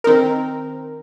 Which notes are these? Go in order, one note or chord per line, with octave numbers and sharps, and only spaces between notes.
D#3 C4 D#4 A#4